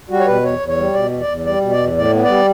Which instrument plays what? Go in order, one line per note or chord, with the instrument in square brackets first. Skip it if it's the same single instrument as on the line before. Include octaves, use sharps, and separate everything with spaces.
[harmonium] G3 F#4
C#5
B2 B4
E2 C#5
E2
C#5
G3
B2 D5
E2
D5
E2
G3 D5
B2
D5
E2
A2 D5
B3
G3 D5